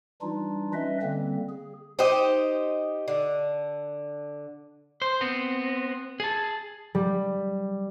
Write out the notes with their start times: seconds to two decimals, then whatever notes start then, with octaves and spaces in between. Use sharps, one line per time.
0.22 E3 G3 D4 D#4 F4
0.74 G3 C#4 B4 D#5 E5
1.02 D3 G3 A#3 C4
1.49 G#4
1.99 D#4 G4 C5 D#5
3.08 D3
5.02 C5
5.21 B3 C4
6.20 G#4 A5
6.95 G3